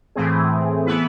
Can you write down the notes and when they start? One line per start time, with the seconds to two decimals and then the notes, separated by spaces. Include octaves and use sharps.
0.16 A2 E3 A3 C4 G#4
0.86 E3 B3 E4 B4